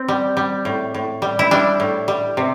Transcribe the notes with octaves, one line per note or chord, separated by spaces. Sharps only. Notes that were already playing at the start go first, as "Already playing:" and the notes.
Already playing: C4
G3
G3
A2
A2
G3
E4
G3 D4
A2
G3
C3